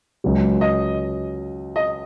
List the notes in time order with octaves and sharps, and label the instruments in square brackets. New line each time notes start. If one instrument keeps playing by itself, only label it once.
[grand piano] C#2 C#3 F#3
[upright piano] D#5
D#5